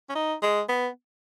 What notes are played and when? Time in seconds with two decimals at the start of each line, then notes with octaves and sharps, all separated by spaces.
0.09 C#4
0.15 D#4
0.42 G#3
0.69 B3